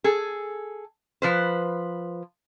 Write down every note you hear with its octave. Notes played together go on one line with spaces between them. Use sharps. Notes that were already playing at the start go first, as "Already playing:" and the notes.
G#4 A4
F3 B4 C5